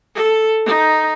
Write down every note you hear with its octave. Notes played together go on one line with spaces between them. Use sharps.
A4
D#4